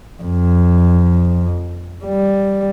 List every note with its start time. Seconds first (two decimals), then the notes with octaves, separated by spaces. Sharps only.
0.22 F2
2.05 G3